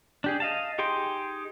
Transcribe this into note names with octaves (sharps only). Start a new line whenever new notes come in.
D4 G4 G#4
D#5 F5 A5
D#4 G4 G#4 G5 C6